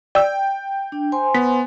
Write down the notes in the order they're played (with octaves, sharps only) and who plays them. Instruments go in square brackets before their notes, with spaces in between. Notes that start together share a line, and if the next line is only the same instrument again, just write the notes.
[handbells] D5 E6 [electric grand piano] G5
[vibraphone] D4
C5 G#5 C6
[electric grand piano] B3 [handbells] B6